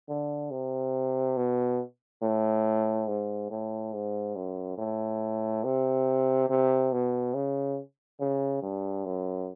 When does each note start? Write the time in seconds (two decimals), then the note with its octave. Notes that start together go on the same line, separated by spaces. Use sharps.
0.09 D3
0.51 C3
1.37 B2
2.22 A2
3.08 G#2
3.51 A2
3.93 G#2
4.36 F#2
4.78 A2
5.64 C3
6.49 C3
6.92 B2
7.34 C#3
8.20 C#3
8.62 G2
9.05 F#2